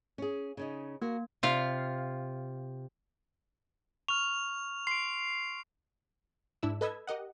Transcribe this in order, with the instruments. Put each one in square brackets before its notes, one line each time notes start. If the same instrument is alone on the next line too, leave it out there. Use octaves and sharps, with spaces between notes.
[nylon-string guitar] C#4 G#4
C#3 C#4 D#4
[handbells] A#3 [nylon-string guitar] F#4 A#4
[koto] C3 F4 F5
[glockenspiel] C#6 F6 [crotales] F7
[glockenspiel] C6 D7 [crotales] C7
[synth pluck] G#2 D4 E4 E6
A4 B4 D#5 B5 E6 G#6
G4 A#4 D#5 F#5